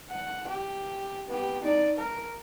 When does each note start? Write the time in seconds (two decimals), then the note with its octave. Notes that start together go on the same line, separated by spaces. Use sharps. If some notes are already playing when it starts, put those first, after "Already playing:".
0.10 F#5
0.49 G4
1.28 B3 G4
1.63 D#4 D5
1.98 A#4